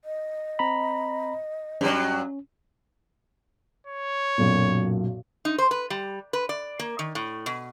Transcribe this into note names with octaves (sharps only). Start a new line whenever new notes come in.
D#5
C4 A#5 B5
G2 F#3 C#4
C#5
B1 F#2 A#2
D#4
C5
B4
G3
B4
D5
A#3
D#3
A2
B2